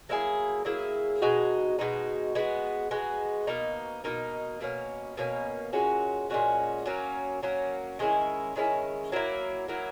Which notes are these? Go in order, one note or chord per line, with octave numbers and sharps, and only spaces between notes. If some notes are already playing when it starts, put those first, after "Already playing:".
F#3 A#3 E4 G#4
F#3 A#3 E4 G#4
B2 G#3 D#4 F#4
B2 G#3 D#4 F#4
G#3 B3 F#4
G#3 B3 F#4
B2 A#3 D#4
B2 A#3 D#4
B2 A#3 C#4
B2 A#3 C#4
A#2 G#3 C#4 F#4
A#2 G#3 C#4 F#4
F#3 A#3 C#4
F#3 A#3 C#4
D#3 G#3 C#4 E4
D#3 G#3 C#4 E4
F#3 A#3 E4
F#3 A#3 E4